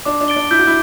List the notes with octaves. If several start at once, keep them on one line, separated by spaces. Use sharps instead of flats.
D4 D6
D4
A6 D7 G7
D4
E4 G6
F#4
E4